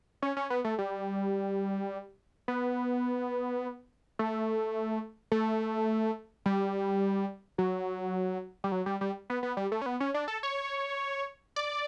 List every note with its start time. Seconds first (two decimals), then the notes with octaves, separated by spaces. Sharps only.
0.22 C#4
0.37 C#4
0.50 B3
0.65 A3
0.78 G3
2.48 B3
4.19 A3
5.32 A3
6.46 G3
7.58 F#3
8.64 G3
8.72 F#3
8.86 G3
9.01 G3
9.30 B3
9.43 B3
9.57 G3
9.72 A3
9.82 C#4
9.86 B3
10.00 C#4
10.14 D4
10.28 A4
10.43 C#5
11.56 D5